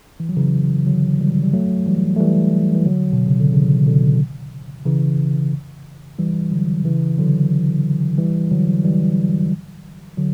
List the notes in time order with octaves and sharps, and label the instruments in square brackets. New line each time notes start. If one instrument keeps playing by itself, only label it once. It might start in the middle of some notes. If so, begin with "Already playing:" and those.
[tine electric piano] E3
F#3
C#3 E3
D3 F#3
E3 G3
G3
F#3 A3
E3 G3
A3
E3 G3
E3
D3 F#3
B2
C#3
D3
C#3 E3
B2 D3
C#3 E3
E3 G3
D3 F#3
C#3 E3
D3 F#3
E3 G3
D3 F#3
E3 G3
D3 F#3